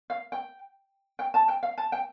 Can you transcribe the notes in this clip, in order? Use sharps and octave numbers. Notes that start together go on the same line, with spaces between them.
F5
G5
G5
A5
G5
F5
A5
G5